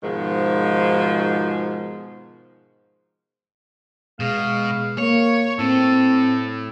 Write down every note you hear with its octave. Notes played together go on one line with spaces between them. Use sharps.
G#2 B2 D#3 F3
B2 G#3 F5
A#3 C#5 C#6
A2 C4 A4